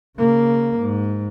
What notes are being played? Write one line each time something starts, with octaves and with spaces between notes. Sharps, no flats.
C#3 A#3
G#2